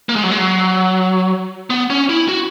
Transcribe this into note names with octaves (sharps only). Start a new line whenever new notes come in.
A#3
G#3
F#3
G#3
F#3
B3
C#4
E4
F#4